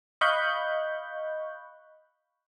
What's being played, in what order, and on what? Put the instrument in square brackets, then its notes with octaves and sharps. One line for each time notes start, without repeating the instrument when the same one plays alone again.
[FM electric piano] D#5 F5 B5 C#6 F#6 G6